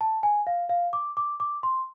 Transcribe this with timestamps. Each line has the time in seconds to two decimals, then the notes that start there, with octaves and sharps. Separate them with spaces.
0.01 A5
0.23 G#5
0.47 F5
0.69 F5
0.93 D6
1.17 D6
1.40 D6
1.63 C6